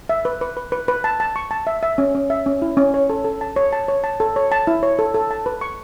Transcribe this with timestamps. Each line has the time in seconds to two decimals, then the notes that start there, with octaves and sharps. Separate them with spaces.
0.09 E5
0.25 B4
0.41 B4
0.57 B4
0.72 B4
0.88 B4
1.04 A5
1.20 A5
1.36 C#6
1.51 A5
1.67 E5
1.83 E5
1.98 C#4
2.15 C#4
2.30 E5
2.46 C#4
2.62 E4
2.77 C#4
2.94 C#5
3.10 A4
3.24 A4
3.41 A5
3.56 C#5
3.73 A5
3.88 C#5
4.04 A5
4.20 A4
4.36 C#5
4.52 A5
4.67 E4
4.83 C#5
4.99 A4
5.15 A4
5.31 A5
5.46 B4
5.61 C#6